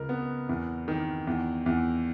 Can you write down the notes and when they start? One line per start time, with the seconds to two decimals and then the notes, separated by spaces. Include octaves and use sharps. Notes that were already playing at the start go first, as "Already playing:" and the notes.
Already playing: C#2 A#4
0.09 B3
0.49 E2
0.88 D#3
1.27 E2
1.66 E2